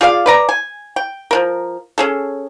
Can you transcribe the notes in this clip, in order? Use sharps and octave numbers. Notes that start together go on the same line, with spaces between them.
F4 G#4 D5 F5
B4 D5 A#5
G#5
G5
F3 D4 A#4
C#4 G#4 A4